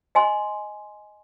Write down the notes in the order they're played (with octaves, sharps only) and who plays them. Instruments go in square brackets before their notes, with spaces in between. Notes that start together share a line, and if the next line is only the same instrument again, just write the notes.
[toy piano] D#5 G#5 C6